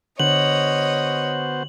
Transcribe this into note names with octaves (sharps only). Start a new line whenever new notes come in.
D3 B3 F#4 C5 C#5 D#5 F#7